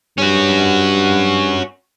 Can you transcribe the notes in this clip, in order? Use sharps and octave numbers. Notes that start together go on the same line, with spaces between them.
G2 C#4 F#4